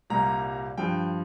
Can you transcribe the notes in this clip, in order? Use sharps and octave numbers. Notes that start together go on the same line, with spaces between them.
C2 A#2 G3 A#5
G2 F3 G5